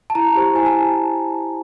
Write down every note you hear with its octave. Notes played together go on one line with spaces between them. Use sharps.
A5
E4 A#5
G4 C5
E4 G#5
A5